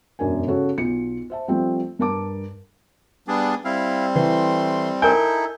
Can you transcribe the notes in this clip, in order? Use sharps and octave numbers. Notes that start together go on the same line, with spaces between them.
E1 F#2 D4 A#4 G#5
C#3 C#4 F#4 A4
B1 F4 C#7
C5 E5 A5
F3 G3 A3 C4
G2 A#4 A5 D6
G3 B3 D4 G#4 D5
G3 C4 E4 F5
E3 A3 C6
D#4 E4 A4 A#4 G#5 G6